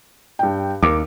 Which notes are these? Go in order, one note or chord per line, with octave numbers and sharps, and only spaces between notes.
G2 G5
D#2 A#4 D6